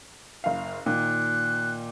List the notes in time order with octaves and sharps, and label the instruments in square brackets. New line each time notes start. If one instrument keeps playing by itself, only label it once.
[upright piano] F#1 F5
[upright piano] A#2 D#3 A#3 [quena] F#6